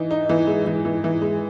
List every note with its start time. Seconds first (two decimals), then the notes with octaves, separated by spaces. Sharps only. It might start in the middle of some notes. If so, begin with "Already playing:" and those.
Already playing: E3 D#4
0.11 D#4
0.29 E3
0.47 G#3
0.66 E3
0.85 E3
1.04 E3
1.22 G#3